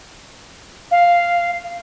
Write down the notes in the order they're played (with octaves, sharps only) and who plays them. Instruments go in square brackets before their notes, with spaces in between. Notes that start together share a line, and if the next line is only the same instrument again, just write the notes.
[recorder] F5